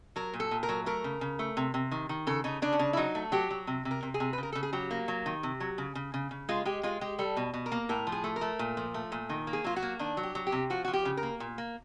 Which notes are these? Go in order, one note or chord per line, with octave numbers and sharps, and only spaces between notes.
F#3 A#4
A#2
A4
A#2
A#4
F#3
A3 A#4
C#3
C#3
A3
C3
C3
D#3
D#3
C#3 A4
C#3 D#4
C#3 D4
C#4
C#3 D4
E4
F#3 D#4
A3
F#3 G4
F#3
C3
C3
A#4
C3
G#4
C3
B4
C#3 A#4
C#3 A4
G#4
F#3 G4
A#3
F#3
D#3
C3
F#3
C#3
C#3
C#3
C#3
G#3 F4
G#3 G4
G#3 F4
G#3 G4
G3 A4
B2
B2
A#4
A#3
A2 A#4
F3
G#4
A3
A#4
A3
A#2
F3
A3
A#2
D#3
A#3
G#4
F#3 F4
F#4
A#3
D#3 D4
F#3
G4
F#3
G4
C3
F3 F#4
F3 F#4
G4
C#3
A#4
A#3
A#2
A#3